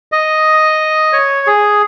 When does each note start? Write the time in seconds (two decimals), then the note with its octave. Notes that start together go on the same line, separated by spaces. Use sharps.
0.12 D#5
1.13 C#5
1.47 G#4